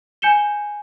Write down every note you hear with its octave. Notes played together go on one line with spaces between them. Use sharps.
G#5 G6 C#7 E7 G7